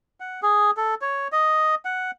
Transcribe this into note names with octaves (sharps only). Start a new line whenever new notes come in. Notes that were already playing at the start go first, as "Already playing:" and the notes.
F#5
G#4
A4
C#5
D#5
F#5